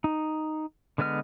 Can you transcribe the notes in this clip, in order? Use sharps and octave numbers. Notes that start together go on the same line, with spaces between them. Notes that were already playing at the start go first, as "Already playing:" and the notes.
D#4
D3 G#3 B3 D#5 F6